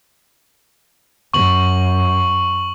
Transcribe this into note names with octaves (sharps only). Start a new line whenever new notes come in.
F#2 C#6 F#7